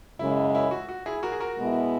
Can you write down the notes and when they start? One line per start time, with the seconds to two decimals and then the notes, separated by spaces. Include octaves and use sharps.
0.19 F#2 C#3 G#3 E4
0.54 E4
0.71 F#4
0.89 F#4
1.06 E4 G#4
1.23 F#4 A#4
1.32 G#4
1.40 F#4 A#4
1.57 B2 G#3 B3 E4